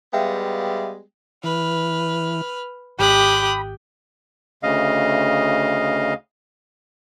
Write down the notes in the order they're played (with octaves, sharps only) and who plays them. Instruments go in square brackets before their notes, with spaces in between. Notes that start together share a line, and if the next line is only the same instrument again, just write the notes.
[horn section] G3 G#3 B3 [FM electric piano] E5 F5 G5
[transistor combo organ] E3 [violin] B4 F6
[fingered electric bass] G#1 [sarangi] G4 [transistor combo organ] B5 [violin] D#6 F#6
[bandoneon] D2 C#3 D#5 F5